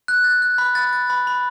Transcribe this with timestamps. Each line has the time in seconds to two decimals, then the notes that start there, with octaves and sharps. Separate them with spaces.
0.08 F#6
0.24 A6
0.42 F#6
0.58 B5
0.75 A6
0.93 A6
1.10 B5
1.27 B5